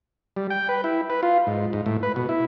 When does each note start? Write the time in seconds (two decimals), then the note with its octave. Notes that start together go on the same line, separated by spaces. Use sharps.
0.37 G3
0.50 G5
0.69 B4
0.84 E4
1.10 B4
1.23 F4
1.47 G#2
1.73 G#2
1.86 A2
2.03 B4
2.16 B2
2.29 E4